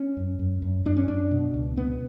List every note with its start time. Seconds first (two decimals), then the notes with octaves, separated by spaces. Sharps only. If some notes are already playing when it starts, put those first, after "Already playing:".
Already playing: C#4
0.17 F#2
0.39 F#2
0.62 F#2
0.85 F#2 D4
0.97 C#4
1.08 F#2 D4
1.31 B2
1.54 C#2
1.76 B2 B3